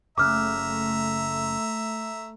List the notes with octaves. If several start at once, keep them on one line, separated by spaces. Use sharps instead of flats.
F#1 C#3 A3 E5 A#5 D6 F6 F#6